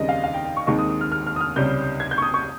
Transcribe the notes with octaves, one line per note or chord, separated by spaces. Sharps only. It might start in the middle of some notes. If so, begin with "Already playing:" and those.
Already playing: D#2 C#3 G3 C4 D#4 D#5
F5
F5
G5
G5
C#6
D#2 D#3 G#3 C4 D#4 C#6
D#6
D#6
F6
F6
F6
D#6
F6
C#2 C3 G3 C#4 G6
G#6
G6
C#6
D#6
C#6